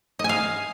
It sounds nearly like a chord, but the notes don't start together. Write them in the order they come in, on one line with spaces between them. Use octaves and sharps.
D#5 G#5 F5